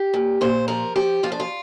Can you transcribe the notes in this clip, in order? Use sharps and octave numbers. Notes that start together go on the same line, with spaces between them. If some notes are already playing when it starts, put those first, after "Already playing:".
Already playing: G4
A#2
A#2 C5
F3 A#4
F3 G4
F3 F4
D4
F4